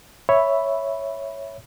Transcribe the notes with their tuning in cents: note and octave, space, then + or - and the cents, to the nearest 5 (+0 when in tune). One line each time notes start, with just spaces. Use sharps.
C#5 +0 E5 +0 B5 +0